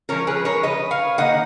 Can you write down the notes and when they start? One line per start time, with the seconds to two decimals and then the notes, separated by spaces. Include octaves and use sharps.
0.09 F3 G#3 C#4 A#4 C#5
0.27 G#4 B4
0.45 A#4 C#5
0.63 B4 D#5
0.91 C#5 F5
1.18 D#3 A#3 D#4 D#5 F#5